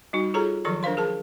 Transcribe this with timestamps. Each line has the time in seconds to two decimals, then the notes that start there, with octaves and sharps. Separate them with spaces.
0.13 G3 D#4 F#4
0.34 F4 G#4 A4 C#5 A#5
0.65 D#3 F3 F#3 A4 C#6
0.83 D4 A#4 C5 F5 C6
0.97 G#4 A#4 A5